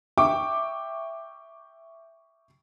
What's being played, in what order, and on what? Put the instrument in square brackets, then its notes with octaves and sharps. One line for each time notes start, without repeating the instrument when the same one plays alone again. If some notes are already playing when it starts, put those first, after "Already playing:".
[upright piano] E5 G5 C#6 D6